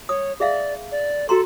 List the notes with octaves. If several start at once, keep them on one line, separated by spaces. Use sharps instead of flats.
C#5 D#6
G#4 D5 E5 F5
D5
F#4 A4 A#5 C6